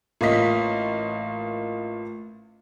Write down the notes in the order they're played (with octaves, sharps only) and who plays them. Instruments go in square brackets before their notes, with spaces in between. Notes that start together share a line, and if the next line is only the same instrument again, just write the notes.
[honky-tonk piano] A1 A#3 F4 D#5 B6